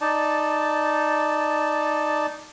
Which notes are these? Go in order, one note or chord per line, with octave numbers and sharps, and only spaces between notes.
D#4 D5 A5